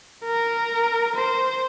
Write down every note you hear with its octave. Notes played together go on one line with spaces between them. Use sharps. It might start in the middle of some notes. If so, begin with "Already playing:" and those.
A#4
C5